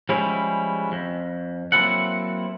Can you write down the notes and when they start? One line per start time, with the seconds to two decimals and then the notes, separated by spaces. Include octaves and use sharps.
0.09 F3 G3 G#3 C#4 E4
0.92 F2
1.72 F#3 A#3 C4 E4 A4 F#5